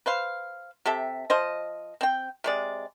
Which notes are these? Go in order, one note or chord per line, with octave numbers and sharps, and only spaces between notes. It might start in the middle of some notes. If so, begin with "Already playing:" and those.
B4 C5 F5
C3 G4 A4 E5
F3 C5 D#5
C4 G5
C3 G#3 D5